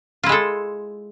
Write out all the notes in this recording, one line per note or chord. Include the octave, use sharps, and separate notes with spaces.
G#3 E4 F4 A4